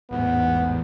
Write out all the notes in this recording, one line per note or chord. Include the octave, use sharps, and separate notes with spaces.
A1 E2 G#2 B3